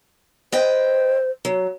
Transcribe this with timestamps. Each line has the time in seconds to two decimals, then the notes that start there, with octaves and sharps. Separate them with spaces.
0.52 B4 C5 D#5 G5
1.45 F#3